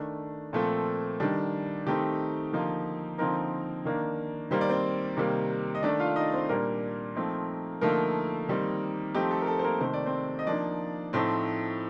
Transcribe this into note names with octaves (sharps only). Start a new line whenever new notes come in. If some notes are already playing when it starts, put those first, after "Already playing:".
Already playing: D#3 A3 D4
A#2 F3 A3 C4 A4
D#3 G3 D4
D#3 A3 C4 D#4 G4
D3 F3 A#3 D#4
D3 F3 A#3 C4 D#4 A#4
D#3 A#3 D4
D#3 G3 A#3 C5
D5
C4 C5
C3 D#3 G3 A#3
D#5
D#3 A3 D4 D5
F4 F5
D#4 D#5
C4 C5
A#2 G3 A#3 D4 A#4
F3 A3 C4 D#4
D3 F3 A3 A#3 D#4 A#4
D#3 G3 C4 D#4
F3 A3 C4 D#4 G4
A4
A#4
A4
C5
A#3 A#4
C3 D#3 A3 C5
D5
C4 C5
D#5
F3 A#3 D4 D#4 D5
A2 F3 A3 C4 D#4 C5